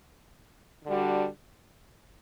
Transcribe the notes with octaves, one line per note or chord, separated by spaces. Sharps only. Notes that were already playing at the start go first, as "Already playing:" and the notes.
D3 G3 D4 F#4